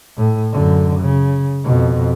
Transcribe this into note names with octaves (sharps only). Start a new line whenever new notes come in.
A2
F#2 D3
C#3
F2 B2